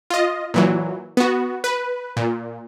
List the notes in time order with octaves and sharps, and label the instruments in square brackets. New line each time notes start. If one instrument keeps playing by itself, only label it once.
[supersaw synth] F4 D#5
A#2 E3 F#3
B3 F#4
B4
A#2